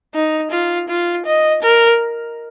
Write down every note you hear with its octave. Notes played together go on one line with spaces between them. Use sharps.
D#4
F4
F4
D#5
A#4